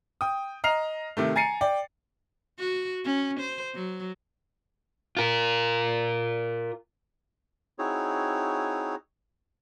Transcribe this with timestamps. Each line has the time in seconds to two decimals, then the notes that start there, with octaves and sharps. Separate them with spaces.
0.21 G5 D#6
0.64 D#5 A#5 F6 C7 F7
1.17 C3 D#3 A3
1.36 G#5 A#5 A6 C7 C#7 D#7
1.61 D5 G5
2.59 F#4
3.05 C#4
3.40 C5
3.75 F#3
5.17 F4 A#4
7.79 C4 D#4 E4 F#4 G#4 C#5